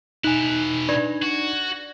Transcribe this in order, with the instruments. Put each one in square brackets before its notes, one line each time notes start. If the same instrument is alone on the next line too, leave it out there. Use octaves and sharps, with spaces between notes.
[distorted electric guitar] B2 E4 [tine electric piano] D#4 G#5 [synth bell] F#6
[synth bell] D4 D5 G#6
[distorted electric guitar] F#4